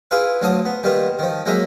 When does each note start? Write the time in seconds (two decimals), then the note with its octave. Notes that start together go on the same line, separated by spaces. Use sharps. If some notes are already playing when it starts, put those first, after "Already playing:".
0.11 E4 F4 G#4 B4 F5
0.42 D2 F#3 F4 A5 D#6
0.65 B3
0.83 D#3 G3 A#3 B3 F4
1.19 D#3 F3
1.46 F#3 G#3 A#3 D#4 D#5 E5